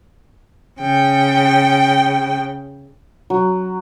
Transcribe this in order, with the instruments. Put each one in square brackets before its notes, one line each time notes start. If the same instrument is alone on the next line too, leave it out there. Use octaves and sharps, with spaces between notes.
[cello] C#3 G5
[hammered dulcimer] F#3